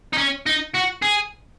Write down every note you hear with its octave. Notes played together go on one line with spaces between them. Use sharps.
D#4
C#4
D#4
F#4
G#4